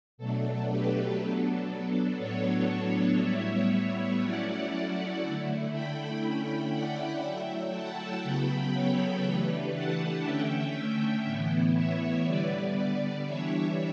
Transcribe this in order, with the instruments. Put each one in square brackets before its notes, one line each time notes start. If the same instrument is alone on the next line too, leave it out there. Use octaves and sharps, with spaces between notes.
[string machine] B2 F#3 A3 D4 A4
G4 B4
F#3 B3 D4 A4
A4
A2 F#3 B3 D4 A4 C#5
A2 G3 B3 E4 C#5 E5
C#5 E5
F#3 A3 C#4 E4 D5 F#5
D3 A3 E4
G5 B5
D3 A3 C#4 E4 G5 B5
D5 F#5
F#3 A3 E4 E5 G5
F#5 A5
C#3 F#3 B3 G5 B5
A4 C#5
E3 A3 D4 G4 B4
F#5 A5
D3 A3 C#4 E5 G5
A2 E3 B3 E4
C#5 E5
D3 G3 B3 B4 D5
B4 D5
E3 G3 D4 C#5 E5